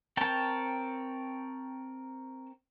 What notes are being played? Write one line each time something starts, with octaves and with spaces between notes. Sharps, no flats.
C4 A#4 C#5 G5 A5